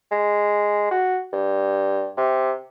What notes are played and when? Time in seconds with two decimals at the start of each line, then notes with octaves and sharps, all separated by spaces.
0.11 G#3
0.91 F#4
1.33 G2
2.17 C3